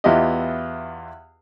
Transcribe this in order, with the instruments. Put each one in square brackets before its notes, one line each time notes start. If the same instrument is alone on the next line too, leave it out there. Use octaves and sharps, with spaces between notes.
[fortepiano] E2 B3 E4 F4 G4 D#5